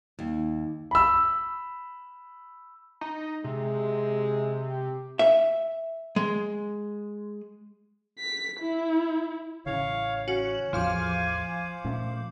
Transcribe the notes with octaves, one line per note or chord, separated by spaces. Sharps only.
D#2
B5 E6
D#4
C3 G#3
G4
E5
G#3
B6
E4
A1 C#3 E3 C#5 F5
C#4 F#4
A1 E2 F3 C5 F5 G#5 D6
A#2 A3 C#4